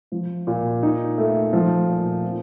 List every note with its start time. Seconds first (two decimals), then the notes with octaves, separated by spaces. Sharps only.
0.12 F3
0.47 A#2
0.83 D#4
1.18 A3
1.53 F3
1.88 A#2
2.23 C4